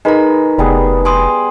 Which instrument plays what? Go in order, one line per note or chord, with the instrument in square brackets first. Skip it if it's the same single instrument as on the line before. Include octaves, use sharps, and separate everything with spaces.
[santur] G#3 B4 [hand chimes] D#4 A#4 A#5
[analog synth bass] F1 [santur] G3 B3 G#4
[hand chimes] G#5 C6 D#6